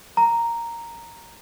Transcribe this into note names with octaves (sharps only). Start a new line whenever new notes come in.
A#5